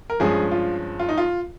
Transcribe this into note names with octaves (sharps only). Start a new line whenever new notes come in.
A#4
G2 F3 G#3 C#4 G#4
F4
F4
D#4
F4